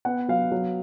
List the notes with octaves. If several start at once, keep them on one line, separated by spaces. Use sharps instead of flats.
B3 F#5
F#3 F5
F#3